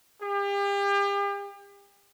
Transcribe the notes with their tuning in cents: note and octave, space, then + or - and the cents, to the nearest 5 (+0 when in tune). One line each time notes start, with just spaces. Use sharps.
G4 +40